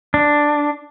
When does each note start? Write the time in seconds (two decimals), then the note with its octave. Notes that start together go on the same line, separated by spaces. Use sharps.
0.14 D4